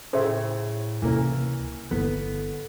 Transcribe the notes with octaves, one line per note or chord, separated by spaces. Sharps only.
A2 C#3 C5 E5
C#2 C3 E3 A#3 C#4
G1 D3 B3 E4